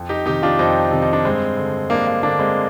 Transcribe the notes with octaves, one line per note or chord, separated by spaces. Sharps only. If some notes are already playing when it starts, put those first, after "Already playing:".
Already playing: F2
D#4 G4
C3 D#3 D#4 G4
D4 F4
F2 C4 D#4
C3 D#3
D#4
D4
G2 G#3 C4
D3
G2 A#3 D4
A#3
D3 A#3 D4
G#3 C4